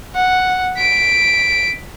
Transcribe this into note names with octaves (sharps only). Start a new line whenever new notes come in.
F#5
B6 D7